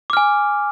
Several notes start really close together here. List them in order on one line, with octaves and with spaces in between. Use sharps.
D6 F6 G#5